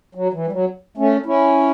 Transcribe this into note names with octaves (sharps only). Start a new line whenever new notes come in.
F#3
E3
G3
F#3
A3 C#4
C#4 E4